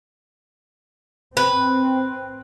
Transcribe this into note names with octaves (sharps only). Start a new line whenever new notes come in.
C4 B4